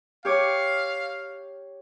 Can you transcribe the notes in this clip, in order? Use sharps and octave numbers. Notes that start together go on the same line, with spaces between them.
G4 C#5 F5 D6